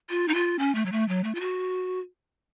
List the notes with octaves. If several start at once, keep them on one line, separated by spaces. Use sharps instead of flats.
F4
D#4
F4
C#4
A3
F#3
A3
F#3
A3
F4
F#4